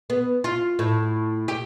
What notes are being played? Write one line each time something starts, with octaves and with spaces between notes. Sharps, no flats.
B3
F4
A2
G4